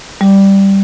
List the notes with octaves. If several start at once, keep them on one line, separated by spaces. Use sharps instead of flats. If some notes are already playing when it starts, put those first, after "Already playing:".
G3